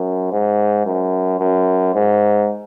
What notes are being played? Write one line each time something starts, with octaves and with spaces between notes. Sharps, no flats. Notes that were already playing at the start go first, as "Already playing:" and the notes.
Already playing: F#2
G#2
F#2
F#2
G#2